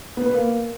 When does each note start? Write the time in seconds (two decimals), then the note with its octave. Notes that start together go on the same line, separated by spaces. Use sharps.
0.17 B3
0.26 B4
0.34 A#3